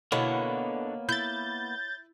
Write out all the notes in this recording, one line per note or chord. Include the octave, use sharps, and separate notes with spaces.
B2 D3 A#3 B3 E4 C#5
E4 G6 A6